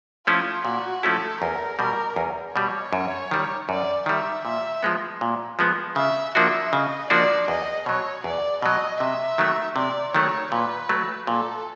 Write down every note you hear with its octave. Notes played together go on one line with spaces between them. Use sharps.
F3 A3 C#4 E4 F4
A#2 F#4
F3 A3 C#4 E4 A4
E2 A#4
B2 G3 A#4
E2
B2 G3 C#5
F#2
D#3 G3
F#2 D5
D#3 G3 E5
A#2 E5
F3 G#3 B3
A#2
F3 G#3 B3
C#3 E5
F3 A#3 D4 F#4 E5
C#3 D#5
F3 A#3 D4 F#4 D5
E2 D#5
B2 F#3 C#5
E2 D5
B2 F#3 D#5
C3 E5
D#3 F#3 A3
C3 D5
D#3 F#3 A3 C#5
A#2 B4
F#3 A3
A#2 A4